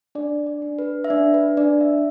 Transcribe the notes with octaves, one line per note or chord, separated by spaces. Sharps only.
D4 D5
D5
D4
B4
E5
D4 D5
B4
D4 D5
E5